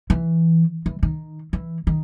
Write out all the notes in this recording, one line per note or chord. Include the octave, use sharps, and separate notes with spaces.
E3
E3
D#3
E3
D#3